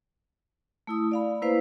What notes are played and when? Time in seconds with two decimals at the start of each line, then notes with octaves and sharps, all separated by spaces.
0.87 A3 E4 D#6
1.11 D5 F5 B5
1.42 A#3 E4 B4 C5 F5